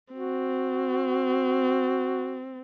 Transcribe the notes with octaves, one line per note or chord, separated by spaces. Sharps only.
C4 F#4